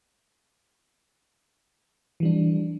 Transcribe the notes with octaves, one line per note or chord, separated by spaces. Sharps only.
E3 G3 D4